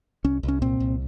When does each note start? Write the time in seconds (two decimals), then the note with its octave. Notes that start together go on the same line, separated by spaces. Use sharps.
0.24 C2 C#4
0.43 C2
0.48 C#4
0.62 A#2 C4
0.80 C2